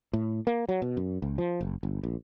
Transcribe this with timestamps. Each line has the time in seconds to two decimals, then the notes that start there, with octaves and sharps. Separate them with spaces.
0.13 A2
0.47 A#3
0.69 F#3
0.82 B2
0.97 F#2
1.22 C#2
1.38 F3
1.61 F#1
1.83 G1
2.03 A#1